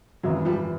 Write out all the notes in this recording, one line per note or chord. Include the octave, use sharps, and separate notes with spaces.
G#1 F#2 C#3 E3 F#3
F3 G3